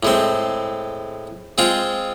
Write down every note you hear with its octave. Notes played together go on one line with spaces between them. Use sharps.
A2 G#3 C4
G#3 C4 F4 G#4